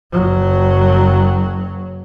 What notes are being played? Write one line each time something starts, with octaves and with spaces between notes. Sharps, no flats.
F#1 F#3